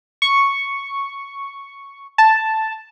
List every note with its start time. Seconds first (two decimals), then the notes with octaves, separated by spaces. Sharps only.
0.22 C#6
2.18 A5